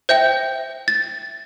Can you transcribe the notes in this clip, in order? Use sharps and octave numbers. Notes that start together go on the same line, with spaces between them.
C5 E5 G5 G6
A6